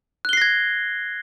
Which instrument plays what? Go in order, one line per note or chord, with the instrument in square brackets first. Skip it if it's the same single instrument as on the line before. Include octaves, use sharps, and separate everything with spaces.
[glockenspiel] F#6
G7
C7
A#6
G#6